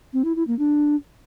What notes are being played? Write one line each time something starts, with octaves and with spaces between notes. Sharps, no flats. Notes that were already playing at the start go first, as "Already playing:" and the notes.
C4
E4
E4
A#3
D4